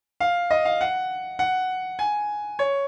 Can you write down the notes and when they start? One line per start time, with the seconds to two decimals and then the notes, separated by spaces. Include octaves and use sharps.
0.20 F5
0.51 D#5
0.65 F5
0.81 F#5
1.39 F#5
1.99 G#5
2.59 C#5